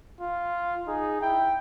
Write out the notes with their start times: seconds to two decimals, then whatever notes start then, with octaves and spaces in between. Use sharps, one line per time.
0.21 F4
0.87 D#4 G#4
1.21 E4 G5